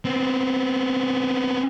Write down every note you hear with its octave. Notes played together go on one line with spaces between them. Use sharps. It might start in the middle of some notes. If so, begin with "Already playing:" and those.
B3 C4